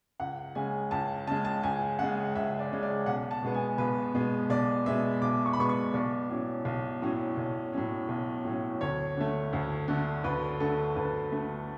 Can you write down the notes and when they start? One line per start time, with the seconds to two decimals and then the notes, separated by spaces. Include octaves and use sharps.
0.20 C#2 F#5
0.55 C#3 G#3 G#5
0.91 C#2 A5
1.27 C#3 A5
1.31 G#3
1.45 A5
1.63 C#2 G#5
1.99 C#3 G#3 F#5
2.35 C#2 E5
2.59 D5
2.71 C#3 G#3
2.82 D5
3.06 B1 F#5
3.31 A5
3.43 B2 G#3 B3
3.54 G#5
3.78 B1 B4
4.15 B2 G#3 B3
4.50 B1 D5
4.86 B2 G#3 B3 E5
5.22 B1 D6
5.46 C#6
5.53 B5
5.58 B2 G#3 B3 C#6
5.69 C#6
5.94 B1 D5
6.30 A2 F#3 C#4
6.65 B1
7.02 A2 F#3 C#4
7.37 B1
7.73 A2 F#3 C#4
8.09 B1
8.45 A2 F#3 C#4
8.81 D2 C#5
9.17 D3 A3
9.53 D2
9.88 D3 A3
10.24 D2 B4
10.60 D3 A3 A4
10.96 D2 B4
11.32 D3 A3